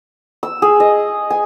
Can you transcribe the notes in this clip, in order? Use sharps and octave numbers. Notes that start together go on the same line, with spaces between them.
E6
G#4
D#5
G#5